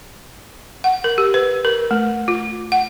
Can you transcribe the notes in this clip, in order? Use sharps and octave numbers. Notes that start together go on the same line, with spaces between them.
F#5
A#4
G4
B4
A#4
A3
F4
F#5